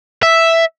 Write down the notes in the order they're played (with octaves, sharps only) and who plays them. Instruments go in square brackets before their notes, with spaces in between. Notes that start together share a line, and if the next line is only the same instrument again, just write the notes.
[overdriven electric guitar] E5